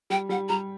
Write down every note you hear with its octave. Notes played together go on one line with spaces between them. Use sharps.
G3 G5
G3 F#5
G3 A#5